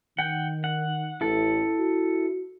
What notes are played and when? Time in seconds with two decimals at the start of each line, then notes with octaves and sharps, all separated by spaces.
0.19 D#3 F#5 G5
0.64 F#5
1.21 A1 E4 A4
1.79 F#4